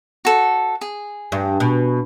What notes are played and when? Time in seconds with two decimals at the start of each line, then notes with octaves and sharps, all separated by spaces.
0.25 F#4 A4
0.81 G#4
1.32 G2
1.60 B2